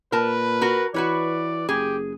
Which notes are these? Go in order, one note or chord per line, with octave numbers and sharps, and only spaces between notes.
A#2 A#4 B4 A5
F#4 A#4
E3 F#4 B4 C#5 D5
F#1 G4 G#4